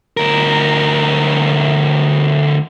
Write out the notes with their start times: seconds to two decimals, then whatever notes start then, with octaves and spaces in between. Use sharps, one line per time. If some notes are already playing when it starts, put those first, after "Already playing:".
0.17 D2 A#4